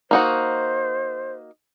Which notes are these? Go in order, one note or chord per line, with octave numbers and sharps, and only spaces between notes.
A#3 D#4 F#4 C5